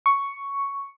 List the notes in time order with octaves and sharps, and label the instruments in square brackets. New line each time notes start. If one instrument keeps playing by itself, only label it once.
[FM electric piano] C#6